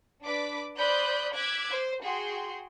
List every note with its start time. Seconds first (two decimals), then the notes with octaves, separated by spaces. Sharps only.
0.24 D4 B4 D6 B6
0.78 C5 D5 B5 D#6 F#6 G6
1.35 D6 E6 F#6 G#6 B6
1.70 C5
2.03 F#4 G#4 G5 C6